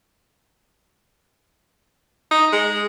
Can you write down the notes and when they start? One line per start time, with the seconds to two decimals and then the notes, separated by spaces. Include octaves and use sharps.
2.31 D#4
2.53 G#3